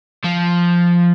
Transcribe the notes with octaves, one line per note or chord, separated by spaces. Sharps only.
F3